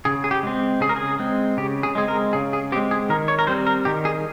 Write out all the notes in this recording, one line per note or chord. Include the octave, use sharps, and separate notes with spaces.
C#3 G#4
G#4
G4
G#3 C4
C#3 G#4
A#4
G#4
G#3 C4
C#3 G4
G#4
G#3 C4 G#4
A#4
C#3 G#4
G#4
G#3 C4 G4
G#4
D#3 A#4
C#5
A#4
G3 C4 C5
A#4
D#3 G4
G#4